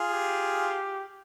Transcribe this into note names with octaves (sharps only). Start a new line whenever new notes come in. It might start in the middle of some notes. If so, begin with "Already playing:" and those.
Already playing: F4 G#4
G4